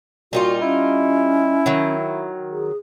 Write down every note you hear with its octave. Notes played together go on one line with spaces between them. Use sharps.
A#2 G3 D#4 F4 F#4
C#4 E4
D#3 F#3
G#4